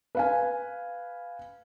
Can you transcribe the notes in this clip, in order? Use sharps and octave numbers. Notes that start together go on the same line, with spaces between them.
B4 F5 G#5